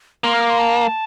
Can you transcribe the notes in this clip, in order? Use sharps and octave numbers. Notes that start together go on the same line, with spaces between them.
A#3 C6
F6
D6
C6
A5